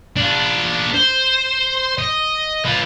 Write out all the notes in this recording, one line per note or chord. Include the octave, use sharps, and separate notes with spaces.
D4 F4
C5
D#5
F4 B4